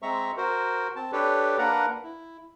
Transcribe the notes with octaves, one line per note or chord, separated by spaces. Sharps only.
G#3 C4 E5 A#5 C#6
F#4 A#4 C5
C4 A5
D4 G4 A4 B4 C#5 D5
A#3 D4 A#4 B4 F#5 A#5
E4